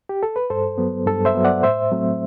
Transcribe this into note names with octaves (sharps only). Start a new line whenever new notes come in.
G4
A4
B4
G2 A4 C5
F#3 B3
G2 A4
C5 E5
F#3 B3
D5 F#5
A2 C5 E5
F#3 A3 C4